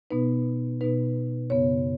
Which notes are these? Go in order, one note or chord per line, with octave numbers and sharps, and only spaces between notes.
B2 B3 D#4 B4
B2 B3 D#4 B4
F#2 C#3 B3 C#5